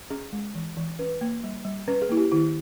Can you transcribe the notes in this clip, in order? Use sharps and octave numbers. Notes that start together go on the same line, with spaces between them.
C#4 G#4
G#3
E3
E3
C#4 B4
A#3
G3
G3
C#4 B4
G#4
A#3 E4
G4
D#3 E4